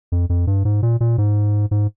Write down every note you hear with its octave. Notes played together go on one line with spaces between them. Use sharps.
F2
F2
G2
G#2
A#2
A#2
G#2
G#2